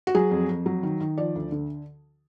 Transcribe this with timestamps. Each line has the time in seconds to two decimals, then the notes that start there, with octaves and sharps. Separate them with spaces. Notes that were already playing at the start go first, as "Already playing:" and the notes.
0.07 F#4
0.15 F#3 G#4
0.31 F2
0.49 F2
0.66 F#3
0.83 D#3
1.00 D#3
1.18 F3 D5
1.35 D2
1.52 D3